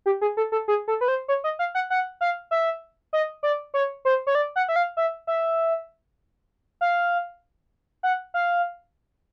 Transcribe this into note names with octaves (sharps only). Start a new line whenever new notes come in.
G4
G#4
A4
A4
G#4
A4
B4
C5
C#5
D#5
F5
F#5
F#5
F5
E5
D#5
D5
C#5
C5
C#5
D5
F#5
E5
F5
E5
E5
F5
F#5
F5